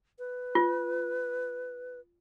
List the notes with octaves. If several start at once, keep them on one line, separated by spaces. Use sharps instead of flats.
B4
F4